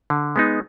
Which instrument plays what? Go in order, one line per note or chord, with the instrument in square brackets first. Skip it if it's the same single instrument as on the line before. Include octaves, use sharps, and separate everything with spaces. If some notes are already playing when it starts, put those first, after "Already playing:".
[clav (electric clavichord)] D3
G#3 B3 D#4